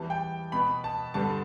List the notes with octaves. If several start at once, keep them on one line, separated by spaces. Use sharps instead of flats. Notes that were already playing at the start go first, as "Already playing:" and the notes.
Already playing: E2 E3 G3 B3 A5
G5
B2 B3 B5
A5
G2 D3 G3 B3 A5